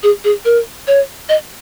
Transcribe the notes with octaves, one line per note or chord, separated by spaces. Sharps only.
G#4
G#4
A#4
C#5
D#5